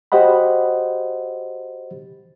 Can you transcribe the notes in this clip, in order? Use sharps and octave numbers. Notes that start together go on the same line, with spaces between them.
F#4 G4 C5 D#5 F#5 B5